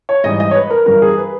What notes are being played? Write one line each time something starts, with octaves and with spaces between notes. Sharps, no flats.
C#5
G#2 E3 G3 D#5
D#5
C#5
B4
A#4
G2 E3 G3 A#4
G#4
B4